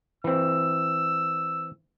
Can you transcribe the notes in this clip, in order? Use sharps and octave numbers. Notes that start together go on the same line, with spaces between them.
E3 C4 E6